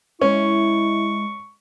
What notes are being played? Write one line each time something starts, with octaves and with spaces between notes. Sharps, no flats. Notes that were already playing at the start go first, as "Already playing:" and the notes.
G#3 C#4 E4 C#6